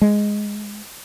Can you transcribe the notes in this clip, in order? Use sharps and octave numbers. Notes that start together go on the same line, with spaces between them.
G#3